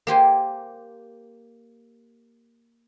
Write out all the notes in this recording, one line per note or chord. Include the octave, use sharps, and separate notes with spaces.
A#3 G4 C5 G#5